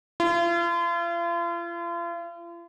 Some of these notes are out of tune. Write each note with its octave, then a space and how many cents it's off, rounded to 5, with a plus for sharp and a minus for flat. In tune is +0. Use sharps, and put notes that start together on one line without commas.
F4 -40